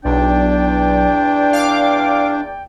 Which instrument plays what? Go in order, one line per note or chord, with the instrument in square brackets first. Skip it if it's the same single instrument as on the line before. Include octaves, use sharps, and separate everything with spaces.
[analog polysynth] B1 [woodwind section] E2 D5 G5 [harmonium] D4
[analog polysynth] F5 D6